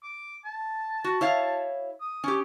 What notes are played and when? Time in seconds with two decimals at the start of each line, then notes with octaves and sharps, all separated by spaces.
0.03 D6
0.45 A5
1.04 F#4
1.21 E4 C#5 F5
2.01 D#6
2.24 C#4 G4